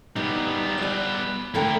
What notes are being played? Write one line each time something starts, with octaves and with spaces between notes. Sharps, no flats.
G3 B3 D#4
D5 G#5
D3 A3 E4 A#4 G5